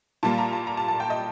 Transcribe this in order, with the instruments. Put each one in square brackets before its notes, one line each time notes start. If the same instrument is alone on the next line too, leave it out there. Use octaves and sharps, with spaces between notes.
[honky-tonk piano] A#2 G3 A#3 A5
A#5
A5
A#5
A5
A5
G5
D#5